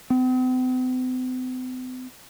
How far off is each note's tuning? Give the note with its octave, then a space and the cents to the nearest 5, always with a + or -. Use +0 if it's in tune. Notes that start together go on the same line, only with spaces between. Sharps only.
C4 -45